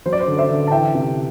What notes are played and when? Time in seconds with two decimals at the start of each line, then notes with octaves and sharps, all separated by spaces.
0.06 F#3 C5
0.13 D5
0.21 C5
0.27 D3
0.38 C5 E5
0.49 D3
0.67 A5
0.71 E3 E5 G5
0.95 C3